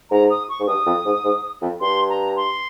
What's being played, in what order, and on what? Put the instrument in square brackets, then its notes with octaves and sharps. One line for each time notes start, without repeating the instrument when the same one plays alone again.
[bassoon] G#2 [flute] A#5
[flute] D#6
C#6
[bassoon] G#2
[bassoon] G2 [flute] D#6
[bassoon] F2
G#2
G#2
F2
[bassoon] G2 [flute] C6
[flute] A#5
C6